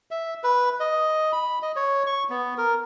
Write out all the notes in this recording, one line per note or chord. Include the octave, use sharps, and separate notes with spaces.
E5
B4
D#5
B5
D#5
C#5
C#6
B3
A#4